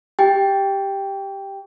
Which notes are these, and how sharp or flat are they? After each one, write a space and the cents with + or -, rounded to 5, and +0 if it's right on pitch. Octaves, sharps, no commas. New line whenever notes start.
G4 +0 G5 +5